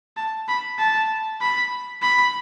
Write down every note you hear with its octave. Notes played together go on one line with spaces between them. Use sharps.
A5
B5
A5
B5
B5